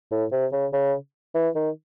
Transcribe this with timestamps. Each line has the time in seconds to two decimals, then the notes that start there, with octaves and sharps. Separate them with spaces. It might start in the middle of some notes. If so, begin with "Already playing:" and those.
0.11 A2
0.32 C3
0.52 C#3
0.73 C#3
1.35 E3
1.55 D#3